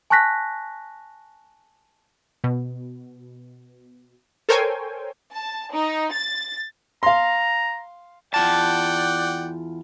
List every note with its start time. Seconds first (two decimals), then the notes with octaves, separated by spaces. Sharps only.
0.10 G#5 A5 C#6 F#6 A#6 B6
2.44 B2
4.49 A4 A#4 C5 C#5 G5 G#5
5.32 A5
5.73 D#4
6.12 A6
7.03 F5 A#5 C6
8.34 E2 F4 D5 F#5 G5 A5